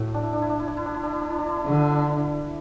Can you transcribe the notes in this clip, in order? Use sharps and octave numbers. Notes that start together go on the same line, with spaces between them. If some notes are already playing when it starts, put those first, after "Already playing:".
Already playing: A2 F#4
D4
E4
D4
E4
D4
E4
D4
E4
D4
E4
D4
E4
D4
E4
D4
E4
D4
D3 E4
D4
E4
D4
E4
D4